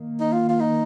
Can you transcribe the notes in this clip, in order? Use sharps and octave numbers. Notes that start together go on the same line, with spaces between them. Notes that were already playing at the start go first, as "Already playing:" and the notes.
Already playing: D#3 A#3
D#4
F4
F4
D#4